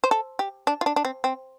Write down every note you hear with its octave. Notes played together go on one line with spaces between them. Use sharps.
C5
A4
G4
D4
F4
D4
D4
C4
C4